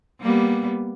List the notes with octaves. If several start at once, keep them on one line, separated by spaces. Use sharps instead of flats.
G3 A#3 B3